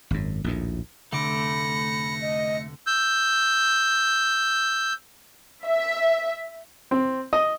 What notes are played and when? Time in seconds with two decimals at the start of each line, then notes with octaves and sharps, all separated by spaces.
0.11 G#1 F#2
0.44 A#1 D#2 A2
1.13 F1 D3 A3 B5 D6 A#6 C#7
2.21 D#5
2.87 E6 G6
5.65 E5
6.91 C4
7.33 D#5